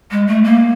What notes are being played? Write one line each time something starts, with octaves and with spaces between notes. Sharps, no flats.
G#3
A3
A#3